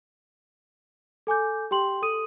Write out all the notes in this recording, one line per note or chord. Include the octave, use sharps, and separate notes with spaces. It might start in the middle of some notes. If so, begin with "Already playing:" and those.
A4 G#5 D6 G6
G4 G5 C6 F#7
A4 D#6 D#7